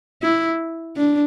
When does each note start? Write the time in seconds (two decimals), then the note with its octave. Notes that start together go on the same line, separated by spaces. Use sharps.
0.22 E4
0.97 D4